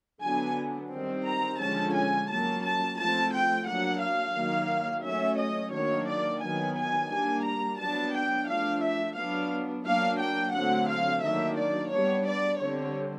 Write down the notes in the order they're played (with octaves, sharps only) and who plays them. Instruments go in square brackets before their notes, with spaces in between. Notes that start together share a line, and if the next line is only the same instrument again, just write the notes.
[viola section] D3 F#3 B3 D4 G#5
D#3 G3 C4
A#5
D3 F3 G#3 C#4 A5
G#5
F#3 A#3 C#4 A5
A5
F3 A3 C4 A5
G5
F#3 A#3 D4 F#5
F5
D#3 F#3 A#3
F#3 A3 C#4 E5
D#5
D#3 F#3 A#3 D4 C#5
D5
D#3 F#3 B3 G#5
G#5
G3 A#3 D4 G#5
A#5
F#3 B3 D4 A5
G5
F3 A3 D4 F5
E5
F#3 B3 D4 F5
F#3 A#3 D4 F5
G5
D3 F#3 A3 C4 F#5
F5
D#3 F#3 A#3 D4 E5
D5
G3 B3 D4 C#5
D5
D3 G3 C4 C#5